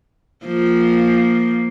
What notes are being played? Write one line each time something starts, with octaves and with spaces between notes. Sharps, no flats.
F3 A#3